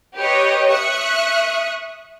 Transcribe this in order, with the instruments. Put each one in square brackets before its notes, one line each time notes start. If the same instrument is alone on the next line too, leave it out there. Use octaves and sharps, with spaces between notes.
[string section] G4 B4 C#5 D#5
E5 C#6 D#6 F#6 C#7